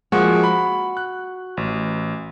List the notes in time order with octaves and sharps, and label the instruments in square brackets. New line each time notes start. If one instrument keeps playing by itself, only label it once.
[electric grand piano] F3 G#3 A#3 [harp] F#4
[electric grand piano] B5
F#6
A1